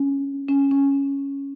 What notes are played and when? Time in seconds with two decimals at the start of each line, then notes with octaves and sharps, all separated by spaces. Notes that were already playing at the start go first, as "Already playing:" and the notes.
Already playing: C#4
0.49 C#4
0.71 C#4